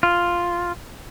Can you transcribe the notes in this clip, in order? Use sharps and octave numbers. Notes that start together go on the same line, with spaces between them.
F4